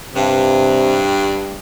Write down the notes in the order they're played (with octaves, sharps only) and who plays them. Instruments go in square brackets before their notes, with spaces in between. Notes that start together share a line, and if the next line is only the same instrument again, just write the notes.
[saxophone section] G2 [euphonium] C3